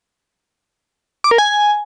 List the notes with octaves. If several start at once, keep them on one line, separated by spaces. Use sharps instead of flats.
D6
A#4
G#5